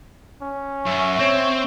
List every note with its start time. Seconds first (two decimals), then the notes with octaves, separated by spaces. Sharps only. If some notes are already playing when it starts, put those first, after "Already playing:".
0.42 C#4
0.86 F#2 E5 C#6
1.19 C4 C#5